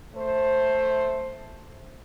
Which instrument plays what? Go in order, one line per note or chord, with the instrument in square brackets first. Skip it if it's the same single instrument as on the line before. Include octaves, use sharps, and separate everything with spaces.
[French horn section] A3 C5